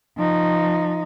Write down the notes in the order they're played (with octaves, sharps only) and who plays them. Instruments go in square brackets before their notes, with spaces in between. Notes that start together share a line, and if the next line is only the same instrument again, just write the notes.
[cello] F3 D#4